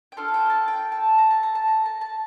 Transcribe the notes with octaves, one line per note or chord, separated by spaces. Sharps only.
G5
D4 F4 A4 F5
F5
G5
A5
G5
A5
A#5
A5
A#5
A5
A#5
A5
A5